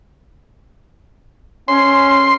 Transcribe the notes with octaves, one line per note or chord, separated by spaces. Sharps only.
C#4 C6